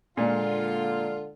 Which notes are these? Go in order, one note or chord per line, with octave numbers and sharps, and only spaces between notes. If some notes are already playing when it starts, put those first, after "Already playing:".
A#2 D3 G#3 A#3 D4 F4